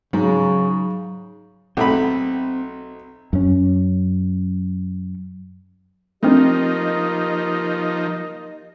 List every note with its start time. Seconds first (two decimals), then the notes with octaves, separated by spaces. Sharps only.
0.13 G#2 C#3 F#3
1.77 B1 A3 C4 B5
3.33 F#2 C#4
6.23 F3 A3 A#3 C4 D4 D#4 G4 D#5